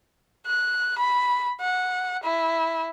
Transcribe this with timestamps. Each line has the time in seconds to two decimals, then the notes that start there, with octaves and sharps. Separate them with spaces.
0.46 F#6
0.98 B5
1.61 F#5
2.24 E4